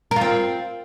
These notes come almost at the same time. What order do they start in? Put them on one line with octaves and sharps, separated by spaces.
A#4 F4 C4